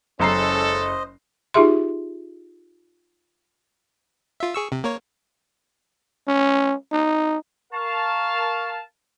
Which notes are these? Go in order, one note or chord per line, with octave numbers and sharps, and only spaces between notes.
F#1 G#3 C#4 A4 C5 D#5 A#5 C7
D#4 F4 G4 G#4 E5 C6
F4 E5
G#4 C#6 E6
C3
A#3 A#4 C#5
C#4
D#4
A#4 F5 A5 C#6